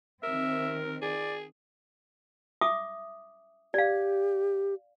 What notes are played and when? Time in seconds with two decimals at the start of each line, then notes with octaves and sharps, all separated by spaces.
0.23 D#3 C4 A#4 E5
1.02 G#4 D5
2.61 E5 D6 D#6
3.74 G4 D5 F5